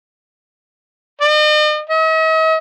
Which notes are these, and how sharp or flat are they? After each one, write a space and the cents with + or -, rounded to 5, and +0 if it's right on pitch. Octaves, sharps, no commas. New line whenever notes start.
D#5 -45
D#5 +45